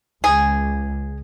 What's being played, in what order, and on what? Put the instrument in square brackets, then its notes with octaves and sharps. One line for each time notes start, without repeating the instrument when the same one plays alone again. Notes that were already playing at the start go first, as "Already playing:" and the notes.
[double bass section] C#2 [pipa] G#4